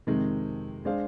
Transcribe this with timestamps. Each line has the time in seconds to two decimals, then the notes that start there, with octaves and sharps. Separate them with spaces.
0.07 F2 C3 D#3 G#3
0.85 G#3 D4 G#4 C5 F5